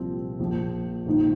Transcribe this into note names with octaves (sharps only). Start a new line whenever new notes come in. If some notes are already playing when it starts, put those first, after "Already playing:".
Already playing: C2 A#2 F3 C4
A#1 A#2 F3
A#1 G#2 D#3 A#3